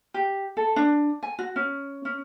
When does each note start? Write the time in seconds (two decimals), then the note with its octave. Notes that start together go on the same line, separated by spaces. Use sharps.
0.14 G4
0.57 A4
0.76 D4
1.23 G#5
1.39 F#4
1.56 C#4
2.05 C#4